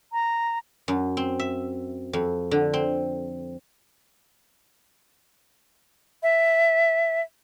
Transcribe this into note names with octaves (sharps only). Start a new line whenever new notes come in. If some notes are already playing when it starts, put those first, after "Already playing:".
A#5
F#2
C4
E5
F2
D3
C4
E5